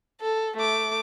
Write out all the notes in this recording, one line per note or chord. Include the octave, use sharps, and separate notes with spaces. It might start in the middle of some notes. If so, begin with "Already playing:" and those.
A4
A3 D6